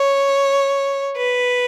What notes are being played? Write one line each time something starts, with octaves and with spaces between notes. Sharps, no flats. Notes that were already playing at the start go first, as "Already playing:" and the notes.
Already playing: C#5
B4